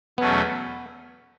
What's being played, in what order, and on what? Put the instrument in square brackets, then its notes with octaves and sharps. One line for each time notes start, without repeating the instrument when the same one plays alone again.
[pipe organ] E2 B2 F#3 A3 C#4 [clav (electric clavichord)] B3